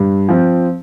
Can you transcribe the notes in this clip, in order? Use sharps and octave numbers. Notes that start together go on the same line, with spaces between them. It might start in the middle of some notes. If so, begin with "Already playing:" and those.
Already playing: G2
F3 C4